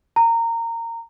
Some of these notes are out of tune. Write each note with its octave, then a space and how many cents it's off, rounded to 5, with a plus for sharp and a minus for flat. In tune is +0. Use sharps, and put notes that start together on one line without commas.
A#5 -20